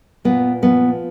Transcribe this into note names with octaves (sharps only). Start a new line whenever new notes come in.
A#2 B3
F3 B3